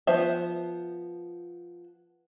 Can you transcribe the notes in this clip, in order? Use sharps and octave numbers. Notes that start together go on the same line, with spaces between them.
F3 B3 C5 E5